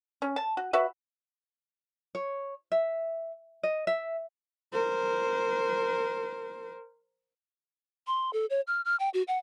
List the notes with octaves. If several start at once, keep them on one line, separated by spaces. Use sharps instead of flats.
C#4
A5
F#4
F#4 B4 E5
C#5
E5
D#5
E5
A#4 C5
C6
A4
C#5
F6
F6
G5
F#4
F#5